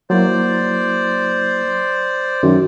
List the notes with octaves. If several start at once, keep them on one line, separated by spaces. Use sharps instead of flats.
F#3 A#3 E4 C5 D5
F#2 D#3